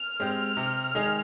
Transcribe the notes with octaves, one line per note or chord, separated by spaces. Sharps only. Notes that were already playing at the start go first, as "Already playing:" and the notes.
Already playing: F6
G#3 C4 G4
C3
D#3 G#3 D#4 G#4